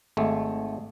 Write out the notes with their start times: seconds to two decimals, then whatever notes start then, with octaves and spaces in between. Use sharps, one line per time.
0.17 G#1 G#3 A3